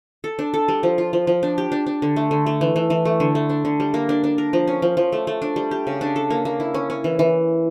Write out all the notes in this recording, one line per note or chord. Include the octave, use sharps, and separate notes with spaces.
A4
D4
A4
G3
F3
F4
F3
F3
D4
G4
D4
D4
D3
A3
D3
A3
E3
E3
E3
A3
D3
A3
D4
D3
G3
A#3
D4
D4
A#4
F3
C#4
F3
F3
A3
A3
D4
G3
G4
C#3
D4
A4
A#3
A#3
E4
C#4
C#4
E3
E3